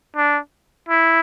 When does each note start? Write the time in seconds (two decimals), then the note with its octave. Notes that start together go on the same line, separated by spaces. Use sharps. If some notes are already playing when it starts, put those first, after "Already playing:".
0.16 D4
0.89 E4